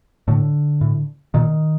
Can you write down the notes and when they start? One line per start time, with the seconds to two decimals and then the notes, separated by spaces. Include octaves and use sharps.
0.28 A2 D3
0.81 A2
1.34 A#2 D#3